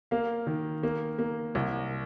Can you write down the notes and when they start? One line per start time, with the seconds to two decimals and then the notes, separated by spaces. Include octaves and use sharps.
0.11 A#3 F5
0.47 D#3
0.83 A#3
1.19 A#3
1.55 C2